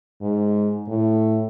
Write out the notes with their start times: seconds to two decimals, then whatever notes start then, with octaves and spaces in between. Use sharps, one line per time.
0.21 G#2
0.88 A2